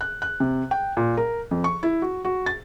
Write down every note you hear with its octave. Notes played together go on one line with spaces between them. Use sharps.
F#6
F#6
C3
G5
A#2
A#4
F2
C#6
E4
F#4
F#4
A6